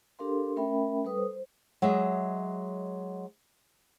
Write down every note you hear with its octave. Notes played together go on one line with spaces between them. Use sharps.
D4 G4 A4 A#4 F5 C6
A3 C#4 A#4 E5 G5 B5
G3 A4 B4 D#6
C5
F#3 G#3 D#5 E5